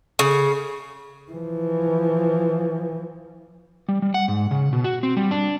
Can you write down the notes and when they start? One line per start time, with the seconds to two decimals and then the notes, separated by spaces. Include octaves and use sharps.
0.19 C#3
1.31 E3 F3
3.89 G3
4.02 G3
4.14 F#5
4.28 G#2
4.51 C#3
4.73 B2
4.84 F#4
5.03 C4
5.17 G3
5.31 D4